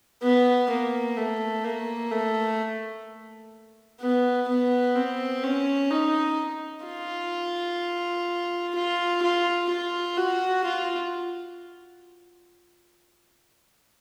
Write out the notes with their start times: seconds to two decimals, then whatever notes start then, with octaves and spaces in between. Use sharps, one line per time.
0.22 B3
0.70 A#3
1.17 A3
1.65 A#3
2.11 A3
4.01 B3
4.48 B3
4.96 C4
5.43 C#4
5.91 D#4
6.86 F4
8.75 F4
9.22 F4
9.70 F4
10.17 F#4
10.64 F4